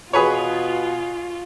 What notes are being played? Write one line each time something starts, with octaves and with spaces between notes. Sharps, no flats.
B2 F4 G#4 B4 C#5